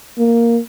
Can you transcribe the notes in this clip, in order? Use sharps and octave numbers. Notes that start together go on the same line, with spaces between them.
A#3